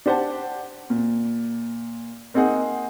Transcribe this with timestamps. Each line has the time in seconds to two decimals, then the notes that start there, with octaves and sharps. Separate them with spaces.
0.06 D4 G4 C5 F#5 A5
0.90 A#2
2.34 A#3 C4 D#4 G#4 F#5